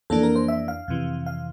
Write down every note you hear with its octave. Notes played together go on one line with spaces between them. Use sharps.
F2 E3 A#3 D4 A4
A#4
C5
E5
F5
F2 C3 E3
F5